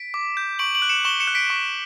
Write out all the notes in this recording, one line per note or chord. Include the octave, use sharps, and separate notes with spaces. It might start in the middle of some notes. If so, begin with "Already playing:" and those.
Already playing: B6 D7
D6
G6
C#6 D7 F#7
D7 F#7
F#6
C#7 E7
C#6 E7 G7
C#7 E7
F#6
B6 D7
C#6